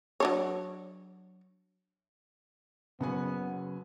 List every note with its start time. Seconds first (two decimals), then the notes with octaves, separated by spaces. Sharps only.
0.20 F#3 D4 C#5
3.01 F#1 C#3 F#3 B3 F#5 G#5